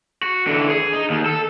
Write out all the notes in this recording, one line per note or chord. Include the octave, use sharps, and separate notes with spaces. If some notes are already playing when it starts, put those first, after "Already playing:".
F#4
D3 E3
G#4
D#4
D#2
A4